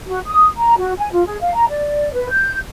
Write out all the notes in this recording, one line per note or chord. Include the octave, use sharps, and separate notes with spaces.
F#4
D#6
A#5
F#4
G#5
F4
G#4
F5
A#5
D5
B4
G6